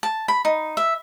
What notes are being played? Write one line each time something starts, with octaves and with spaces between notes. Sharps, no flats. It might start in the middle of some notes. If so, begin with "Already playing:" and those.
A5
B5
D#4
E5